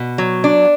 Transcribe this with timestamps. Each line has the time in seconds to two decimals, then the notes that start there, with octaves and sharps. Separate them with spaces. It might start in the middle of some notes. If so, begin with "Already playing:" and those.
Already playing: B2
0.18 F#3
0.44 D4